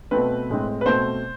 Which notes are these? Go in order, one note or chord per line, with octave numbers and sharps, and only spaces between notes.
B2 A3 C4 B4
A2 G#3 C4
B4
B2 A3 C4 C5